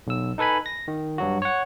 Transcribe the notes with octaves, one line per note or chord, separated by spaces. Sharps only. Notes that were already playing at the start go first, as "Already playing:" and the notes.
B1 E6
D#4 A4 B4 G#5 B5
A#6
D#3
G2 F#3 F#4
C#5 F#5